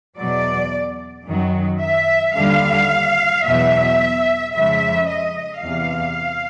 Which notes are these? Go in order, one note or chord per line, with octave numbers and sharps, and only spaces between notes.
E2 B2 F#3 D5
F#2 D#3 F#3
E5
D#2 D3 G3 F5
E2 B2 F#3 E5
F2 C#3 F3 G#3 E5
D#5
E2 C3 E3 F5